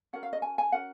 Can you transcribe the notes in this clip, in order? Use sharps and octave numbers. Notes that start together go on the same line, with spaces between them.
C#4 F#4 A#4 F#5
F5
D#5
G#5
G#5
C#4 F#4 A#4 F#5